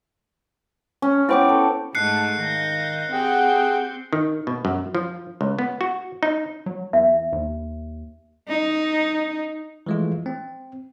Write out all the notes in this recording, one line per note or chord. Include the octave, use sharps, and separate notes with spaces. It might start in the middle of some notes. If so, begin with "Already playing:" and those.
C#4
B3 E4 C5 C#5 G5 D6
A4
G#2 A3 A5 F#6 C7 C#7
D#3 F5 G6 A#6
C4 G4 G#4 F#5 G5 G6
D#3
B2
F#2
F3
C#2
B3
F#4
D#4
F#3
E2 E5
D#2
D#4
E3 F3 G#3 A3 F4
C4